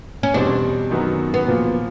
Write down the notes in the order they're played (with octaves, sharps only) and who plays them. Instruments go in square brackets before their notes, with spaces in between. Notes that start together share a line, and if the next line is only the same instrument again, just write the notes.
[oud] C#4
[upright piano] E2 B2 G3 C4 [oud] D4
[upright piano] F#2 D#3 F#3 B3
[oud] B3
[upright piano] A#2 F3 A#3